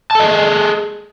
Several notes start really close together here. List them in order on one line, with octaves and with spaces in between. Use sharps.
A5 A4 D#5 G#4